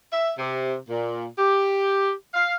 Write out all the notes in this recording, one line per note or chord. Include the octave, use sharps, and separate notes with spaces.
E5
C3
A#2
G4
F5